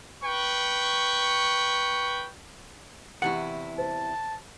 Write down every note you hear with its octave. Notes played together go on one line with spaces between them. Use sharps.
B4 G5 C#6
E2 C3 E4 G4 F#5 C#6
C5 A5